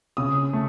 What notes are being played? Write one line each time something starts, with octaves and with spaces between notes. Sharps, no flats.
C#3 D#6
A3